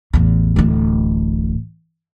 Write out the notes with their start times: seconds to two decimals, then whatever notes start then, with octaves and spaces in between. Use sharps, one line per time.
0.13 A1 E2
0.56 D1 A1